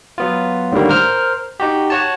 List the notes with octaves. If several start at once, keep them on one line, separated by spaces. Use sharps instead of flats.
F#3 B3 F4
A2 D3 D#3 G3 A#3
A#4 C5 F6
D#4 F#4 G4
F#4 C#5 A5